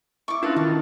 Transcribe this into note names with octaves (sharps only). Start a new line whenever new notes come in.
E4 C#6 D6
C#4 D4 F4 A4 B4
D#3 A5